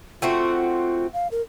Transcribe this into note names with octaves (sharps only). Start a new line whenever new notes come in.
A3 C4 F4 F#4
F5
A#4